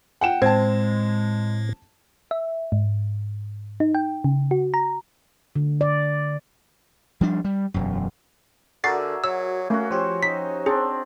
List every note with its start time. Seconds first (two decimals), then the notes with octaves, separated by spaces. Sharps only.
0.21 F#5 G5 E7
0.42 A2 G#3 C4 A5 G#6
2.31 E5
2.72 G#2
3.80 D#4
3.95 G5
4.24 C#3
4.51 F#4
4.74 A#5
5.56 D3
5.81 D5
7.21 F3 G3 D4
7.44 G3
7.74 E1 F#2
8.84 D3 F#4 G#4 A#4 D5 E5 A6 C7
9.24 F#3 E6
9.70 A3 A#3 C#4 F#4
9.91 F3 C#4 G4 C5
10.23 D#4 B6
10.66 C4 D4 G#4